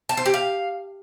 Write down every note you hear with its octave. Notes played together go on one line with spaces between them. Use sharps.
A5
C5
G4
F5